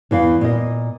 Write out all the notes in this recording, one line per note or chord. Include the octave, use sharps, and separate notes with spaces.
E2 E3 F5
A#2 D#5